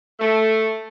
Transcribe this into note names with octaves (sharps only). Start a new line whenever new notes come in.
A3